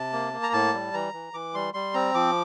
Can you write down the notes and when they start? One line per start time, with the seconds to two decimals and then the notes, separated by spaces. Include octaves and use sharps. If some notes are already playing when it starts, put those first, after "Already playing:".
Already playing: C3 A5
0.13 A#3
0.33 A#3
0.43 A#5
0.53 A2 A5
0.74 G3
0.94 E3 A#5
1.13 E3
1.33 E3 D6
1.54 G3 C6
1.74 G3 C6
1.94 C4 A#5
2.14 F3 D6